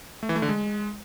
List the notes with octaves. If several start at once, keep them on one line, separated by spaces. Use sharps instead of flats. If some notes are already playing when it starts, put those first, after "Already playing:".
A3
E3
A3
D3
G#3